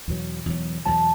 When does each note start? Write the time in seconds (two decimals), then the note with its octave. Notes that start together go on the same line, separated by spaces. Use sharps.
0.08 E2 B2 F#3
0.46 E2 B2 F#3
0.85 E2 B2 F#3 A5